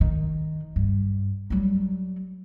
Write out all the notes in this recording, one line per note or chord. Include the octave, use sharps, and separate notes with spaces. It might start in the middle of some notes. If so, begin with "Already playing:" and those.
D#3
G2
F#3 G3